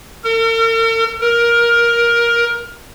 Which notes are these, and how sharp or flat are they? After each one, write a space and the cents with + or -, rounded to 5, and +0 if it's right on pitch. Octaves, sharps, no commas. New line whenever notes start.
A#4 -45
A#4 +15